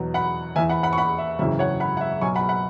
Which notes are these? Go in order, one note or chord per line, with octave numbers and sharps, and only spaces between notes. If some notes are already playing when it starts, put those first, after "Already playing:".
Already playing: E2 B2 F#3
F#5 B5
E2 E3 E5 G#5
F#5 B5
F#5 B5
C#6
F#5 B5
E5
G#1 F#2 C#3 E3 E5
C#5 F#5
F#5 B5
F#5
E5
B1 B2 F#3 G#5 C#6
F#5 B5
F#5 B5